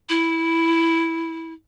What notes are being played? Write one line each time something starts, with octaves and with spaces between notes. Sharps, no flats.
E4